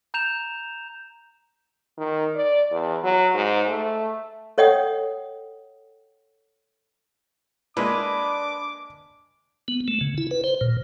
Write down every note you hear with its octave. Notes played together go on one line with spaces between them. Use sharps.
A#5 G6 E7 F7
D#3
D5
E2
F#3
G#2
A3
A4 C#5 D#5 F#5 G5 D#6
G#3 A#3 D4 E4 B4 D6
B3
A3
C#3
E4
B4
C5
A#2